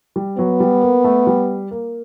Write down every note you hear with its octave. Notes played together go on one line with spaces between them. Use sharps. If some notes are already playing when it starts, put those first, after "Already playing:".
G3
F#3 B3
G3
A#3
A3
G3
A#3